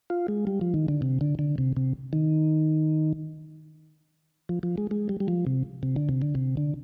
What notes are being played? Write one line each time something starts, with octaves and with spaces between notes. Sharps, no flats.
F4
G#3
G3
F3
D#3
D3
C3
D3
D3
C3
C3
D#3
F3
F3
G#3
G#3
G3
G3
F3
C3
C3
D3
C3
D3
C3
D3